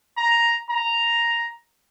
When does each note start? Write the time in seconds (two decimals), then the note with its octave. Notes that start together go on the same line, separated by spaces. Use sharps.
0.17 A#5
0.70 A#5